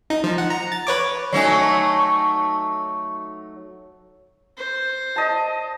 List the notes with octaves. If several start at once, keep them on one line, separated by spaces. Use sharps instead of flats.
D#4
F3
F#5
A#5
A6
B4 C#5 D6
F#3 A3 D#4 C#5 G#5
C#6
C5
D#5 A5